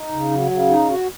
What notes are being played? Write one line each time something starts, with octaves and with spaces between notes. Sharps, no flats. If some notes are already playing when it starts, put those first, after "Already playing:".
Already playing: D#4
C#3
F#3
C#3
D#4
F#4